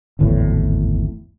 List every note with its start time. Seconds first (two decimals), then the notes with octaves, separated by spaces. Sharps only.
0.19 D1 G#1 E2 A2